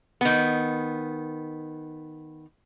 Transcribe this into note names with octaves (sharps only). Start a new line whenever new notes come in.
D#3 B3